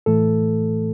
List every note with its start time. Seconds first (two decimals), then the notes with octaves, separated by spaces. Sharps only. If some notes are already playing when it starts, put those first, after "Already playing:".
0.06 A2 E3 A3 A4